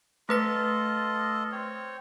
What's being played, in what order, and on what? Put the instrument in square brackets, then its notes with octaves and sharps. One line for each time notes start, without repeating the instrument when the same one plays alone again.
[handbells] A3 B4 B6 [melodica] F4 A4 D#5
[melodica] C4 C#5